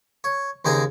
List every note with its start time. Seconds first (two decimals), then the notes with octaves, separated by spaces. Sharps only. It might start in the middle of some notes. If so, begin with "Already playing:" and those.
0.24 C#5
0.65 D#2 C#3 C4 D#5 G#5 A#5